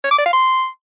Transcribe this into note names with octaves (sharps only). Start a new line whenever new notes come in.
C#5
D6
D5
F5
C6